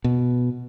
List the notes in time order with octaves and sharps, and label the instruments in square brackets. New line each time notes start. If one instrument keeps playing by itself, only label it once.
[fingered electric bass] B2